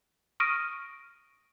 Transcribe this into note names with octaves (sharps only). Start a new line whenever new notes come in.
C#6 D#6 F6 A#6 D7 D#7